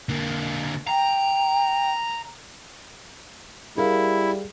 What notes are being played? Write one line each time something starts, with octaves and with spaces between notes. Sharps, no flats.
D3 A#3
G5 A#5
G3 E4 G#4 A#4 F5